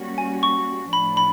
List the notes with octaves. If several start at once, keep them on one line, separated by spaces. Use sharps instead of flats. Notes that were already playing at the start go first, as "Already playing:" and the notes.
Already playing: G3 A#3 C#4 F#4
G#5
C#6
A2 F3 A3 D4 B5
B5